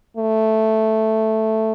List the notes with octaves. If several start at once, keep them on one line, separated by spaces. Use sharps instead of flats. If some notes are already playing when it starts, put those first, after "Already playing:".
A3